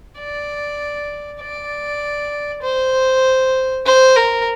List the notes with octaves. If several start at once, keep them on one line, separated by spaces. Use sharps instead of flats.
D5
D5
C5
C5
A#4